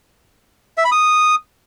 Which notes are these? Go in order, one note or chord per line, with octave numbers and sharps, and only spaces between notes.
E5
B5
D#6